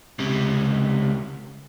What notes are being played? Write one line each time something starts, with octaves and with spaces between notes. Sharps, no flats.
C#2 C3